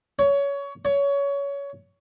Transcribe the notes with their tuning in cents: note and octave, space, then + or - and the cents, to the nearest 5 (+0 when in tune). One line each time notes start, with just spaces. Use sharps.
C#5 +20
C#5 +20